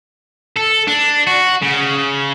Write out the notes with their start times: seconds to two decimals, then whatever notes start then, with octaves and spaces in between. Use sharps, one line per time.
0.57 A4
0.88 D4
1.27 F#4
1.62 C#3